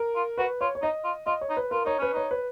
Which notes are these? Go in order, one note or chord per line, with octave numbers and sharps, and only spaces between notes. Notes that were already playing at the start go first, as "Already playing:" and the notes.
Already playing: A#4
F4
F#4 B4
F4 C#5
C#5
D#4 D#5
F4
F4 D#5
C#5
D#4
B4
F4 A#4
D#4 C#5
C#4 B4
D#4 C#5
B4